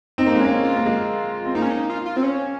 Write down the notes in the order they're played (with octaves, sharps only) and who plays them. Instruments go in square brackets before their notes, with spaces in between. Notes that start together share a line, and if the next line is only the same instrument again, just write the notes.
[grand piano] C4 [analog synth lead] D#4
[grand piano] A#3
G#3
[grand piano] A#3 [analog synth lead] C#4
[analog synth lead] F4
[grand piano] A#3
G#3
C4
[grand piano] A#3 [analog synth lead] D#4
[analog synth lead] C#4
D#4
F4
F4
C4
C#4